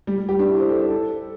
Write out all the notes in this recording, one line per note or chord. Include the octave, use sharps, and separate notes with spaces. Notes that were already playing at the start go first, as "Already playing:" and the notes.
G3
G3
G4
D4
E4
C5
A4
C5
A4